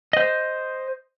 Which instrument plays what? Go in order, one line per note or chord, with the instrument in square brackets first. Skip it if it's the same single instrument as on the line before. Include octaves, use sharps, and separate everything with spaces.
[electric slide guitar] C5 D#5